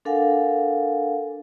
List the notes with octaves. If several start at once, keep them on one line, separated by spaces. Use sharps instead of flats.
D4 A4 A#4 F5 F#5 G#5